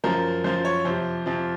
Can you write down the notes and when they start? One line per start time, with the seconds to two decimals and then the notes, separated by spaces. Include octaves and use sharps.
0.04 F#2 F3 A#4
0.44 F#2 F3 C5
0.65 C#5
0.85 F2 C3 F3 C5
1.26 F2 C3 F3